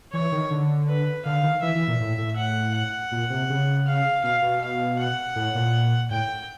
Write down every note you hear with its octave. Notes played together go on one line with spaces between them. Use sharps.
E3 C#5
D#3
D3
B4
D3 F5
D#3
E3 E5
E3
A#2
A2
A2
F#5
F#5
A#2
C3
C#3
F5
B2 F5
B2
F5
F#5
A2
A#2
A2 G5